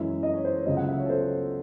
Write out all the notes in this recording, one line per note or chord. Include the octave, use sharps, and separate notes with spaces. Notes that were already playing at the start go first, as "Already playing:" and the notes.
Already playing: F#2 E3 G#3 C#4 E5
D#5
C#5
C5
C#5
C#2 C#3 F#3 D#5
F#5
E5
C#5
A4
C5